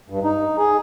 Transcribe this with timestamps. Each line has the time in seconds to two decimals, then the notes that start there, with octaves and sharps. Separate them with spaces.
0.10 G2
0.24 D#4
0.58 G#4